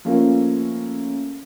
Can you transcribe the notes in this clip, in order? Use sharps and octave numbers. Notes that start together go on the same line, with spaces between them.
F3 A3 A#3 C#4